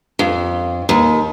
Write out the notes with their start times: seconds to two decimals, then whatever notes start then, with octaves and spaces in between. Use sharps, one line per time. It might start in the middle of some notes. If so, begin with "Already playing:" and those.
0.19 F2
0.89 D#2